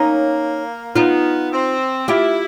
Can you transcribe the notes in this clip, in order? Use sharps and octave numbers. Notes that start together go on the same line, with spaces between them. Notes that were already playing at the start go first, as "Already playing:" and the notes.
Already playing: A#3 C#4 D#4
B3 D#4 F4
C4
E4 F4 G4